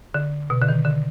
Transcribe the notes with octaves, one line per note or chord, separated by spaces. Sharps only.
D3
B2
D3
D#3
D3